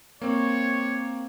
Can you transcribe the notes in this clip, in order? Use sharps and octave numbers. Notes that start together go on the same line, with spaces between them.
A#3 C4 C#5